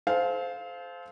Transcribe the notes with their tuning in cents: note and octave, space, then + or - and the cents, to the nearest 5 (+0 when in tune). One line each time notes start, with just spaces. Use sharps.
A4 -35 C5 -10 F5 +0